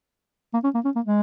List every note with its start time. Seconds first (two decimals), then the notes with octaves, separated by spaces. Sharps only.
0.54 A#3
0.64 C#4
0.75 A#3
0.85 C#4
0.96 A#3
1.06 G#3